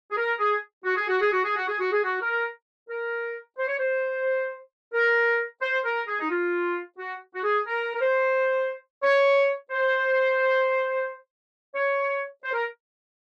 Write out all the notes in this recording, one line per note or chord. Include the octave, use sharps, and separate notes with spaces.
G#4
A#4
G#4
F#4
G#4
F#4
G#4
F#4
G#4
F#4
G#4
F#4
G#4
F#4
A#4
A#4
C5
C#5
C5
A#4
C5
A#4
G#4
D#4
F4
F#4
F#4
G#4
A#4
A#4
C5
C#5
C5
C#5
C5
A#4